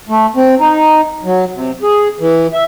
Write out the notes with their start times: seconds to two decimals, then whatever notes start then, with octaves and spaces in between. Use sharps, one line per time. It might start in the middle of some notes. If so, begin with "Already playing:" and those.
0.09 A3
0.36 C4
0.60 D#4
1.24 F#3
1.54 C3
1.83 G#4
2.20 E3
2.53 E5